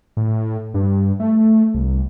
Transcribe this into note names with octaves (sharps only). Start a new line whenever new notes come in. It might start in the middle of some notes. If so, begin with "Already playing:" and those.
A2
G2
A3
C2